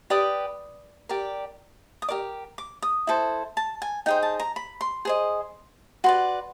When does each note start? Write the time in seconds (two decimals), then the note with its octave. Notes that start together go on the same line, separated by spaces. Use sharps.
0.10 G4 B4 D5 D#6
1.09 G4 A#4 D5
2.02 D#6
2.08 G4 A#4 D5 D6
2.58 D6
2.83 D#6
3.07 E4 A4 C5
3.57 A5
3.82 G#5
4.06 D#4 G#4 C5 G5
4.23 A5
4.40 A#5
4.56 B5
4.81 C6
5.05 G#4 C5 D#5
6.04 F#4 B4 D5 C6